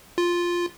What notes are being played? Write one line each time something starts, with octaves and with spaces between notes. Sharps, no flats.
F4